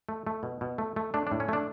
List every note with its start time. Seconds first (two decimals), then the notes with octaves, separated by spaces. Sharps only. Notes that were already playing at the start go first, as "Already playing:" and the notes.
0.09 A3
0.27 A3
0.43 B2
0.61 B2
0.78 A3
0.96 A3
1.14 A3 D4
1.27 A2 D4
1.40 C#4
1.49 A3 D4